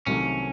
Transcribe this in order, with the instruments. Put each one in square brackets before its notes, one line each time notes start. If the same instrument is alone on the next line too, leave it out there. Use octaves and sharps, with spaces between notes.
[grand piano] C2 C3 D#3 F#3 A3 [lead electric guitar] C#4